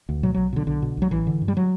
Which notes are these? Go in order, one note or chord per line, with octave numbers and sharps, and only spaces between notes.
D2
B2 F#3
B1 F#3
B2 D3
B1 D3
B2
B1 F#3
A1 E3
D3
G2
G3
F#3